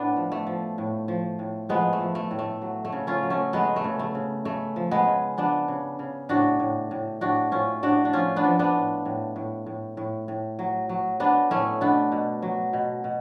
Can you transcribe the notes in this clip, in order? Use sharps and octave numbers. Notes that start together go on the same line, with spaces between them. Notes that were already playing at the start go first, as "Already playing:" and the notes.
Already playing: A2 B3 D4
F3
A3
F3
A2
F3
A2
F3 G#3 B3
A3
F3
A3
A2
A3
F#3
A3
C#3
C#4 F4
F#3
A3 C#4
F#3 G#3 B3
A3
C#3
A3
C#3
C#3 A3
F3
G#3 B3
C#3
F3 B3 D4
C#3
C#3
A2 D4 F#4
A2
A2
A2 D4 F#4
A2 C#4 F4
A2 D4 F#4
D4
F3 C#4 F4
B3 D4
F3
B3 D4
A2
A2
A2
A2
A2
A2
F#3
F#3
F#3 B3 D4
A2 A3 C#4
B2 B3 D4
B2
F#3
B2
B2